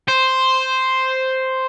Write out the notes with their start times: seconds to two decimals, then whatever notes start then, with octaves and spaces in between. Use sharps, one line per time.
0.08 C5